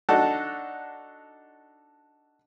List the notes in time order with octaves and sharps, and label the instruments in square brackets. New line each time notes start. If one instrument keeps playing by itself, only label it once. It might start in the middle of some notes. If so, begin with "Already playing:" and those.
[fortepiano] D4 D#4 F#4 A4